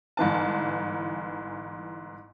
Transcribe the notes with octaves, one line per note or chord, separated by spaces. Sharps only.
G1 G#2 E3 A5